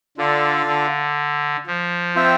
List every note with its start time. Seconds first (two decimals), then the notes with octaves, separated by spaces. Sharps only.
0.18 D3 D4 F4 A4 D5 F5
0.67 D3
1.67 F3
2.16 C4 F4 C5 E5 G5